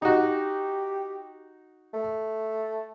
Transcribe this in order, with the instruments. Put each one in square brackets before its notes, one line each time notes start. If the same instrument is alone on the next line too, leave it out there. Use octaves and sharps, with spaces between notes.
[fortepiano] D#4 F#4 [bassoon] G4
[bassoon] A3